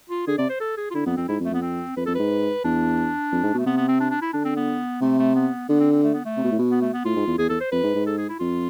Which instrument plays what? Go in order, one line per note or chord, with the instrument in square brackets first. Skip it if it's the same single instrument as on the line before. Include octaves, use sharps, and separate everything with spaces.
[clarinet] F4
[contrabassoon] D3 [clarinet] G#4
[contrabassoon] C3 [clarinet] D5
[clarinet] C5
A4
G#4
F4
[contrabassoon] D3 [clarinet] E4
[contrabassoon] F2 [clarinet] B3
[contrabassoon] F2 [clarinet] C4
[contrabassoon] G#2 [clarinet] E4
[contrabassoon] F2
[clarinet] A3
[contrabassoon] F2 [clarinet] B3
[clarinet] C4
[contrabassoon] F2 [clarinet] B4
[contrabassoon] F2 [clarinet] A4
[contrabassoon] G#2 [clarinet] B4
[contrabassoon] E2 [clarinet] D4
[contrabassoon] F2
G#2
B2
[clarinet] A3
[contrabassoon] C3 [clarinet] B3
[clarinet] B3
C4
D4
D4
E4
[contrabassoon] D3 [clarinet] D4
[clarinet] C4
B3
[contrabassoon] C3 [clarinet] A3
[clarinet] A3
B3
[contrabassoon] D3 [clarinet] B3
[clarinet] C4
C4
A3
B3
A3
[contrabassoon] C3
B2
A2
B2
[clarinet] B3
A3
B3
[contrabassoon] A2 [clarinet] F4
[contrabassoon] G#2
E2
[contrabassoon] E2 [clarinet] G#4
[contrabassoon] E2 [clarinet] A4
[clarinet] C5
[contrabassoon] F2 [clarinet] B4
[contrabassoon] G#2
G#2
[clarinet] A4
G#4
E4
[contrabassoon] F2 [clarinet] F4